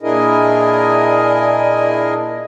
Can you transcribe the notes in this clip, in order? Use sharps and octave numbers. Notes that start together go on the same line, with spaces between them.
A#2 D4 E4 G#4 A#4 D#5